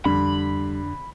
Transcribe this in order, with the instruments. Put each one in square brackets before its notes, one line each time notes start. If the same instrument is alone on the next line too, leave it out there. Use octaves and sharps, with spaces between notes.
[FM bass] F2 [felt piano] D3 [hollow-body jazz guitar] G3 [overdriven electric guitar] B5